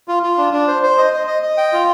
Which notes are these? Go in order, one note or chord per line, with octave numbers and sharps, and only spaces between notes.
F4
F4
D4
D4
C5
C5
D#5
D#5
D#5
D#5
G5
F4